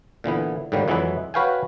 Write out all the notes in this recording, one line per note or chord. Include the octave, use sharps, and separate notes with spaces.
A#2 D3 E3 B3
G#2 D3 D#3 F#3 G3 A#3
F2 E3 F#3 G#3 E4 B4
F#4 B4 C#5 F5 G5 G#5